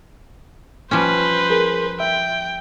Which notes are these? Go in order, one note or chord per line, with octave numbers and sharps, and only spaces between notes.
F3 G3 C#4 B4 C5
G#4 A#4
E5 G5